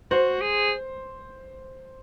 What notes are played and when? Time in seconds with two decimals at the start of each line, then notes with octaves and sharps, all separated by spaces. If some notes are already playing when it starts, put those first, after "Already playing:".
0.11 F#4 C5
0.41 G#4